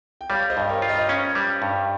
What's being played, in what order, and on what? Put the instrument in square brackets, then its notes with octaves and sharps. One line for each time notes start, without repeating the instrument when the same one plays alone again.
[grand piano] G5
[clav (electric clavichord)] G3 [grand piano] C#5 F5
[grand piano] C5 D#5
[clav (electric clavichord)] G2
[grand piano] A#4 C#5
[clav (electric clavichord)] F4
[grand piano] C5 D#5
[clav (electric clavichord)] C#4
G3
G2